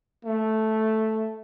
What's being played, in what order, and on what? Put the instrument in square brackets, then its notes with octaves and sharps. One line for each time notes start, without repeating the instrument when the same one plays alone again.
[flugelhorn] A3